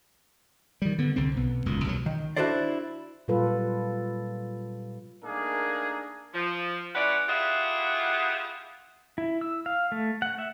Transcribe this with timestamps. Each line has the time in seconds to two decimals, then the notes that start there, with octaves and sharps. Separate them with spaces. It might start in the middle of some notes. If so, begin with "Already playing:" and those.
0.82 D#3 G3
0.98 D3 B3
1.16 C2 D3 C4
1.36 B1 B3
1.66 D#1 C#2 F#2 A#2
1.84 C2 B2 D3 F#3
2.06 D#3
2.36 D4 E4 F#4 A4 C5 D5
3.28 A#2 F#3 G3 F4 A4 B4
5.22 A3 A#3 D4 D#4 G#4 A#4
6.34 F3
6.95 G#3 C#4 E4 B4 D5 F#5
7.28 E4 F4 G4 G#4 E5 F#5
9.18 E4
9.41 E6
9.66 F5
9.92 A3
10.22 F#5
10.38 E5